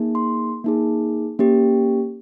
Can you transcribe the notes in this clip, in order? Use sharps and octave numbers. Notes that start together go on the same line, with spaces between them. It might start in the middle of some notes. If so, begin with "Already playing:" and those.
Already playing: A#3 D#4 G#4
C6
A#3 D#4 G#4
A#3 C#4 G4